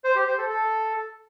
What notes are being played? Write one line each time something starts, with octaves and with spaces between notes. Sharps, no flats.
C5
G4
C5
A4
A4